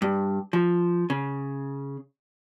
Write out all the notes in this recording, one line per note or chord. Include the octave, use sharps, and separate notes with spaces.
G2
F3
C#3